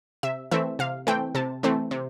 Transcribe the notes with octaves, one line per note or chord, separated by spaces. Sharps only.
C3 E5
E3 A3 C4 E5
C3 F5
E3 A3 C4 G5
C3 A5
E3 A3 C4
C3